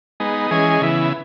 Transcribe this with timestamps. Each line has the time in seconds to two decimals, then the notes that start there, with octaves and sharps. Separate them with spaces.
0.20 G#3 B3 D#4
0.51 E3 G#3 C#4 G#4 D#5
0.82 C#3 E3 B3 E4